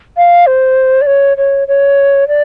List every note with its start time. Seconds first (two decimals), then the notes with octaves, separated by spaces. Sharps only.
0.17 F5
0.47 C5
1.02 D5
1.07 C#5
1.37 C#5
1.68 C#5
2.28 D5